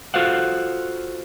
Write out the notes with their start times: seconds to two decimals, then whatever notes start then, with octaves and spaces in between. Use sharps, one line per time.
0.14 F4 F#4 A4 C5 F5 F#5